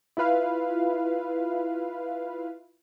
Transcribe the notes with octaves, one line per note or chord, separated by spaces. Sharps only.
E4 F4 B4 F5